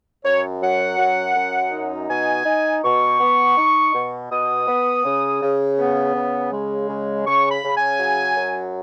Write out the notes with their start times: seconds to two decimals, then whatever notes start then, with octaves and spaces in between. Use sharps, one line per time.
0.25 F#2 C#5
0.62 F#3 F#5
0.98 F#2
1.35 F#2
1.72 D#4
2.09 B2 G#5
2.46 D#4
2.83 B2 C#6
3.20 B3
3.57 D#4
3.93 B2
4.31 B2 D#6
4.67 B3
5.05 C#3
5.42 C#3
5.78 B3
6.15 C#3
6.52 G#3
6.89 C#3
7.26 C#3 C#6
7.50 B5
7.63 C#3
7.76 G#5
8.00 F#3
8.36 F#2